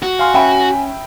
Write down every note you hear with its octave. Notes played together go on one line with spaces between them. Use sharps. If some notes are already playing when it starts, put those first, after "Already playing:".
F#4
F5 G#5 C6 F6
C#4 E5 G5 B5